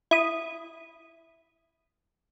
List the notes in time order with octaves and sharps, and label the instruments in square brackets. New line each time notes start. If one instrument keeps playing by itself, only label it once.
[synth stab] E4 D#6